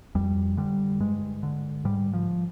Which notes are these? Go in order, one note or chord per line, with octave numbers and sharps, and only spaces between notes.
F2 G3
D3 G3
G2 G#3
D3
G#2 G3
F3